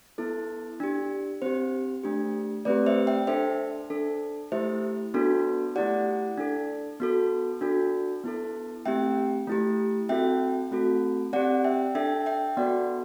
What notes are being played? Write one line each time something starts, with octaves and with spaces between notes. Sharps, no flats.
B3 E4 A4
D4 G4
C4 G4 C5
A3 D4 G4
A3 C4 G4 B4 D5
C5 E5
E5 G5
D4 A4 C5 E5
D4 A4
A3 E4 G4 C5 E5
B3 D4 F#4 A4
A3 E4 G4 D5 F#5
D4 A4
B3 F#4 A4
D4 F#4 A4
B3 E4 A4
A3 C4 G4 E5 G5
A3 E4 G4
C4 F#4 A4 E5 G5
A3 C4 F#4 A4
C4 G4 D5 F#5
E5 G5
D4 A4 E5 G5
E5 G5
B3 F#4 A4 D5 F#5